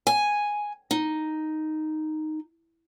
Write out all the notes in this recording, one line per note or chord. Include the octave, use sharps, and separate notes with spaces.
G#5
D#4